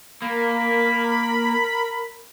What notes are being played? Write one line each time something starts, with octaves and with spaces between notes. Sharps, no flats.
A#3 A#4 B5